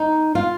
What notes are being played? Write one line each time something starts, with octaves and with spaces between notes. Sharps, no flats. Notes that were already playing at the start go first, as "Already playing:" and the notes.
Already playing: D#4
F4